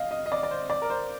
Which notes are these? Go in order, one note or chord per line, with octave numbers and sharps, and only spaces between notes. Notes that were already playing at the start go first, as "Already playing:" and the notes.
Already playing: D#5 F5
D#5
D#5
D5
D5
C5
D5
A#4
C5